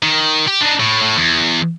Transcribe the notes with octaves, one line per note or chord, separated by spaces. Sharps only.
D#3
G4
D4 D#4
A2
A2
E2